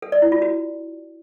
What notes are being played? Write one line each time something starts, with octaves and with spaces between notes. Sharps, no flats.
A4
D5
E4
F4
F#4